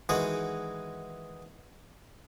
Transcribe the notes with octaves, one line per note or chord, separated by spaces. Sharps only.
D#3 E3 G#3 F#4 G#4 D#6